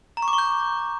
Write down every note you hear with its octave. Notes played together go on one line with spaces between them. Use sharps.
A#5
C#6
D6
C#6
G6